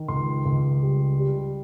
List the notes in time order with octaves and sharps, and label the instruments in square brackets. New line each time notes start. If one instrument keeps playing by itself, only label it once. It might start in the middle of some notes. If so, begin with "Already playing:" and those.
Already playing: [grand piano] D#3
C#2 C6
C#2
G3
G3